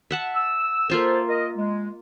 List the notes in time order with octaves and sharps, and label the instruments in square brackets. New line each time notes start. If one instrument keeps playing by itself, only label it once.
[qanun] E5 F#5 A5
[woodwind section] E6
[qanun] A#3 F4 E5 [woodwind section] A4 C5
[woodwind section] A#4 D#5
G#3